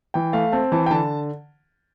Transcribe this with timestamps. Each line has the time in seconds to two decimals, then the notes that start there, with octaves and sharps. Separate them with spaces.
0.14 E3 G5
0.33 A3 F5
0.52 C4 A5
0.72 E3 A5
0.86 G5
0.91 D3 A5